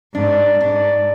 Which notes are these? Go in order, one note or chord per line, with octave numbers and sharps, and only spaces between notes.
G#2 D4
G#2 D4